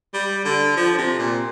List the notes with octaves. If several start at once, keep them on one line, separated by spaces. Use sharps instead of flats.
G3
D3
F3
C3
A#2